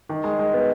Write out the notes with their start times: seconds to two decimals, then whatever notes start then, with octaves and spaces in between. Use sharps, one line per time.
0.09 D#3
0.24 G#3
0.39 G#3
0.54 B3